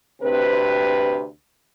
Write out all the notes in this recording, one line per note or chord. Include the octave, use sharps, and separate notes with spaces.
D2 C3 C4 B4